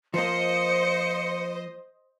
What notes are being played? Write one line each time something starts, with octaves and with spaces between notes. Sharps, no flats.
F3 A#3 C5 D#5 C#7